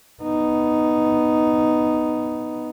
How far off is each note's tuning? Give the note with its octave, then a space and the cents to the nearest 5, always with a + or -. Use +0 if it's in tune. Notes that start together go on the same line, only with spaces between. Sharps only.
B3 +0 D#4 +0